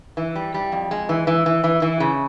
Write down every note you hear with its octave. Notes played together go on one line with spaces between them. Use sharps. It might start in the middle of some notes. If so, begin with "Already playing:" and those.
E3
G3
G3
F2
G#3
E3
E3
E3
E3
E3
C#3